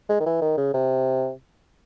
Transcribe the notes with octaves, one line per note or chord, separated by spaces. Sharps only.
G#3
D#3
E3
D#3
C#3
C3